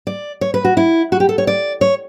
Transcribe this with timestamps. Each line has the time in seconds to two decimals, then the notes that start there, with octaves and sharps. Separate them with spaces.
0.07 D5
0.41 C#5
0.54 B4
0.64 F#4
0.77 E4
1.12 F#4
1.20 G4
1.29 A4
1.38 C#5
1.47 D5
1.81 C#5